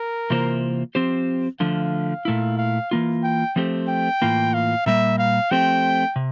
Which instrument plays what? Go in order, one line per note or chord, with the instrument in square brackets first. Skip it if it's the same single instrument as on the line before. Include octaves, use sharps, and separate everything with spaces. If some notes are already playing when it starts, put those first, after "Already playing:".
Already playing: [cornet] A#4
[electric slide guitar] C3 E3 A#3 F4 C5
F3 C4 G4 C5
[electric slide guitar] D3 F3 A3 [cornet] F5
[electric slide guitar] A#2 A3 E4
[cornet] F5
[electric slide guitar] E3 A#3 F4
[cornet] G5
[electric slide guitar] F3 A3 C4 G4 C5
[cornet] G5
[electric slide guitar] A2 E3 A#3 F4
[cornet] F5
[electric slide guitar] A#2 G3 A#3 [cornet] E5
[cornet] F5
[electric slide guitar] F3 A3 C4 G4 C5 [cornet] G5
[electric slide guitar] C3